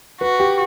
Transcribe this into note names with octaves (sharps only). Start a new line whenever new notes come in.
F#4 B4
G4